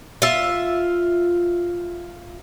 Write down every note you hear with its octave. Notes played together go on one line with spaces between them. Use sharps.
F4 E5